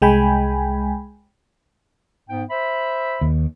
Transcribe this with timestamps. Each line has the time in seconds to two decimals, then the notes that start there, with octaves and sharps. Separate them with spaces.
0.02 C2 G#3 G5 G#5 B5
2.29 G#2 B3 G5
2.50 C5 E5 B5
3.21 D#2